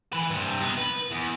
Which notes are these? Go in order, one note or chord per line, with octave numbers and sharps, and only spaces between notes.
E3 B4
G2 C3
B3 D#4
B4
E2